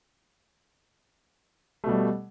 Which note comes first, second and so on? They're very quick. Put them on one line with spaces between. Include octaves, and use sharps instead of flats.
A3 B2 G3